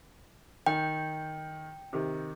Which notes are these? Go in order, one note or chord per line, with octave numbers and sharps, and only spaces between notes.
D#3 G5
C3 D#3